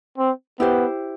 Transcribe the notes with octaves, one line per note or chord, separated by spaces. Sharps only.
C4
B3 E4 G4 C5